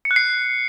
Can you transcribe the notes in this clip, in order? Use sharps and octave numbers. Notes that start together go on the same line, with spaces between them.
C#7
F#6
C7